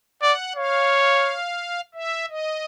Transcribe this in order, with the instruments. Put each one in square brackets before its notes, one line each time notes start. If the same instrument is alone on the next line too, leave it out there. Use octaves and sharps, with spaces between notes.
[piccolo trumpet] D5 [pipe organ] F#5
[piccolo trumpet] C#5 [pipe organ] F5
[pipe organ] E5
D#5